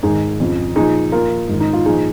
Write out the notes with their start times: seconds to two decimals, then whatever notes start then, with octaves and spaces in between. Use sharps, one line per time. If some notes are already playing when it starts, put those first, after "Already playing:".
0.03 G#2 D#3 D#4 G#4
0.40 F2 C#3 F3
0.76 A#2 F3 D#4 G#4
1.12 A#2 F3 F4 A#4
1.49 G#2 D#3
1.60 D#4
1.73 F4
1.85 A#2 F3 D#4 G#4